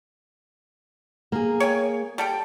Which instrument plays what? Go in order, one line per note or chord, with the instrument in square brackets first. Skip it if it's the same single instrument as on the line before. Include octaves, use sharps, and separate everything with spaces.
[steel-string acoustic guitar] A#3 G#4
[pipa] C#5 G5 G#5
G3 A4 G5